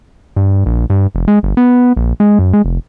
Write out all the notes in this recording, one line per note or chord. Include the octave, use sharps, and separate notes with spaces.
G2
A#1
G2
F1
G#3
G1
B3
A#1
G#3
F#2
G#3
F1